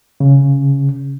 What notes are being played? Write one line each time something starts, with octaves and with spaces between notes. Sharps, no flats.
C#3